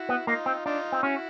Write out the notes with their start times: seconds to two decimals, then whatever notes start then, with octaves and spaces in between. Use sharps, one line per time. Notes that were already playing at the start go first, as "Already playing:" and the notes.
Already playing: E4 F#4
0.09 B3
0.27 A#3 D#4 F4
0.46 C4
0.65 D4 D#4 F4
0.92 C4
1.03 C#4 E4 F#4